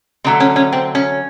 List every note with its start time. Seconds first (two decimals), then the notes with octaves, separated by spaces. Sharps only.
0.24 D3 F#3 A3 C4
0.40 C#4
0.56 C#4
0.73 C4
0.95 C#4